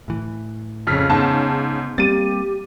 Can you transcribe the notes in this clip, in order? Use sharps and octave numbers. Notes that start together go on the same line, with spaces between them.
A2 E3
F2 C#3 F6 B6
G#2 B3 A5
G3 A#3 C4 G4 A6 D#7